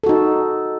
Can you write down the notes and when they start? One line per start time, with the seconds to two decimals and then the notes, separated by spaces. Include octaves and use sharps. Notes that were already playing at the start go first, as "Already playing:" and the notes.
0.04 A4
0.06 F#4
0.09 D#4